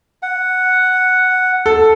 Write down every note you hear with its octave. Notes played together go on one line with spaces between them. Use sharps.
F#5
A4